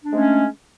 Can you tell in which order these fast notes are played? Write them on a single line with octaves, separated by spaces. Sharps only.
D4 A3 G#3 C#4